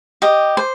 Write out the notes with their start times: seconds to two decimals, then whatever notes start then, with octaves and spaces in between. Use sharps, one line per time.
0.22 G4 D#5
0.57 C5